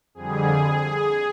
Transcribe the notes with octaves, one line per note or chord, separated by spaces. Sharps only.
F2 D3 G3 G#4